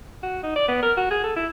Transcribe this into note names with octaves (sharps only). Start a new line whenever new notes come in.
F#4
D#4
D5
B3
A#4
F#4
G#4
A4
E4